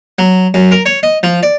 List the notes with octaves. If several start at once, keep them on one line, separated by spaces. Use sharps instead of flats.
F#3
F#2
A#4
C#5
D#5
F3
D5